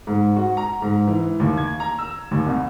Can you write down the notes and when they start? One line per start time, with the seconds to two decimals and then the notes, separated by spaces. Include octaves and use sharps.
0.07 G#2
0.36 F#4
0.57 A#5
0.82 G#2
1.07 E3
1.40 D#2
1.57 G#6
1.80 A#5
1.98 E6
2.31 D#2
2.46 C2